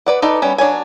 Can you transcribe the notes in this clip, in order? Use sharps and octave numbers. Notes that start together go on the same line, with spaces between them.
B4 D5 F#5
D#4 A4 B4 D5
G3 B3 C#4
F#3 D4 C#5 G#5